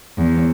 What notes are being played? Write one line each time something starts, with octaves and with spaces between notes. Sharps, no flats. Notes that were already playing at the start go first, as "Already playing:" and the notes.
E2